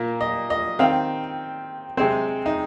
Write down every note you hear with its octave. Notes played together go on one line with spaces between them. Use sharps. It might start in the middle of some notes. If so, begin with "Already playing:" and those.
Already playing: A#2 A#3
D#5
D#5
D#3 C4 F5
C3 G#3 C4 C5
D#4